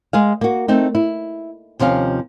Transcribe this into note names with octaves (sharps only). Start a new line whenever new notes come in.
G#3 G#4 F5
A#3 F#4
A3 C4 D#4
E4
D#2 C3 F3 C#4 F5